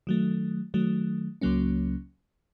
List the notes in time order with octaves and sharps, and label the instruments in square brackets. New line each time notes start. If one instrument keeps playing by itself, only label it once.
[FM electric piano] D#3 F#3 A3
D#3 F#3 A3
C#2 C#3 F#3 A#3 C#4